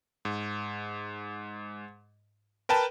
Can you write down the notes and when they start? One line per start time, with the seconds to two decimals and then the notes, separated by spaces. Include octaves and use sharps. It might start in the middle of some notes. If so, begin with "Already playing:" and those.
0.25 G#2
2.69 A#4 B4 G5 A5